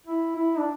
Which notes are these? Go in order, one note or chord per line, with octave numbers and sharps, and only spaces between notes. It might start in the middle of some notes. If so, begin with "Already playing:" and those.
E4
E4
D4